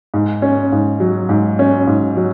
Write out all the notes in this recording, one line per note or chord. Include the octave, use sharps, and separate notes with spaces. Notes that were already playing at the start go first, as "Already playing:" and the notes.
G#2
C#4
G#2
F#3
G#2
C#4
G#2
F#3